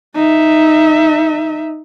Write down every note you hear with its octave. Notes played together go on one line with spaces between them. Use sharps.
D#4 E5